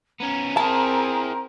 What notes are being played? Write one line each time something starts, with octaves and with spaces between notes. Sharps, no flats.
B3 C#4 A#5
C4 E4 G#4 A#4 A5